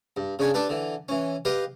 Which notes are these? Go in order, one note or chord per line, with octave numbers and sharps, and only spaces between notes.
G2
C#3 D4 C#5 G#5
D4 G4 A4 B4
D3 E3
E3 C#4
G4 B4 D#5 F5